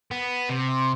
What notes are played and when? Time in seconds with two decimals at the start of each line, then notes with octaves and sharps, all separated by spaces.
0.11 B3
0.49 C3